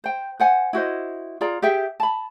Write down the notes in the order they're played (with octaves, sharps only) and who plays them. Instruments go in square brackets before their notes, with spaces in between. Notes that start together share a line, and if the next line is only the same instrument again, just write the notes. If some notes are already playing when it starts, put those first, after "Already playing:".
[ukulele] C5 G5
C5 F#5 G#5
E4 F#4 C5 D#5
F4 G#4 D5 A#5
G4 G#4 E5 G5
A5 B5